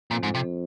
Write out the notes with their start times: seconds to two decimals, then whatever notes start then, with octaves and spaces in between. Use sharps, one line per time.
0.11 F2 A#2
0.23 G#2
0.35 C3